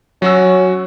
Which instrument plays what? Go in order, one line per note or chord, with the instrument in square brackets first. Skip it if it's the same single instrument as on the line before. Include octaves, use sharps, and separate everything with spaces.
[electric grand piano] F#3 F#4 E6 [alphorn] C#4